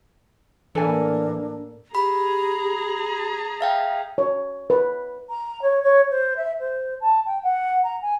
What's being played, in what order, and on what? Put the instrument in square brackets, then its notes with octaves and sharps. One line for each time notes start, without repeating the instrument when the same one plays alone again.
[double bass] A2 A#3 [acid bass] E3 [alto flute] D4 [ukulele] A4 D5 G#5
[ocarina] G4 [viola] G#4 A#5 [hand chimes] B5
[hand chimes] E5 F5 G5
[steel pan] C#5
B4
[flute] A#5
C#5
C#5
C5
E5
C5
A5
G5
F#5
A#5
G#5